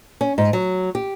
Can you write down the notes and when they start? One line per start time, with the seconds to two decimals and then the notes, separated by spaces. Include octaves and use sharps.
0.21 C#4
0.38 G#2
0.53 F#3
0.95 G4